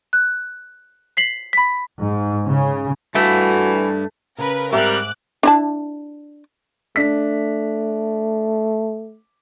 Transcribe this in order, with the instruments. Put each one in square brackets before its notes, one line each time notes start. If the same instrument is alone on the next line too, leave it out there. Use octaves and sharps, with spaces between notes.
[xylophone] F#6
B6 C7 F#7
B5 B6
[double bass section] G#2
C#3
[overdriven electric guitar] G2 [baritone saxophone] E3 [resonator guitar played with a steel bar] A3 [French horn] F#4
[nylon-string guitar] C#3 [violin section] A#4 B4
[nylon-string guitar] G#2 E5 [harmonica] G3 C4 A#4 [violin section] D6 F#6
[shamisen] D4 E4 A5
[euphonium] A3 [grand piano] D4 B6